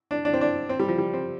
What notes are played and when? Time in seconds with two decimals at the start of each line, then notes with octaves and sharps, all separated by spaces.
0.11 D4
0.25 D4
0.33 C4
0.41 D4
0.69 C4
0.80 G3
0.88 F3
0.98 G3
1.14 C4